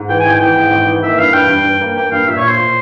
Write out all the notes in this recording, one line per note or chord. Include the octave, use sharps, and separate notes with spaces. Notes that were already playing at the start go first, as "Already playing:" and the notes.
Already playing: G#2
E3 G5
G#5
G#1 G5
E3 G5
G#2
G#1
E3
A#3 E5
G2 F5
G2 G5
G2
G2
A#3
A#3 G5
G2 F5
A#2 E5
C#5
A#2 C5
A#2